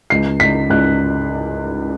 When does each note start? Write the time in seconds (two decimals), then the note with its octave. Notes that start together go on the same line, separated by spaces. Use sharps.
0.10 C#2 C7
0.40 C#2 B6
0.70 C#2 F#6